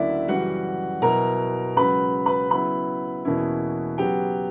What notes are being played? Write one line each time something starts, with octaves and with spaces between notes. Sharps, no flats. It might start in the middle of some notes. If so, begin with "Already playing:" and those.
Already playing: D2 C#3 F#3 A#3 E4 D5 E5
F#2 C#3 E3 G3 F#4 F#5
B2 F#3 B3 E4 A#4 A#5
C#2 C#3 F#3 B4 B5
B4 B5
C#3 F#3 B3 E4 B4 B5
E2 B2 A#3 C#4 E4
C#3 F#3 B3 G4 G5